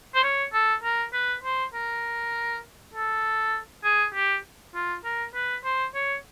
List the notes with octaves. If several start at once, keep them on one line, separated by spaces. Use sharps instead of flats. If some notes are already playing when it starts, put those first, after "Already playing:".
C5
C#5
A4
A#4
B4
C5
A#4
A4
G#4
G4
F4
A#4
B4
C5
C#5